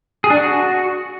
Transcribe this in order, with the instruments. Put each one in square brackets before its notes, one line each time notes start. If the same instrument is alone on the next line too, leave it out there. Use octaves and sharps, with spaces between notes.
[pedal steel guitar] G#4
D4
F#4